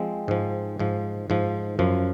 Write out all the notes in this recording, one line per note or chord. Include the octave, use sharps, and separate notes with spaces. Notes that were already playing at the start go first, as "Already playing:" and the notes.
Already playing: F3 G#3 C4
G#2 F3
G#2 F3
G#2 F3
F#2 F3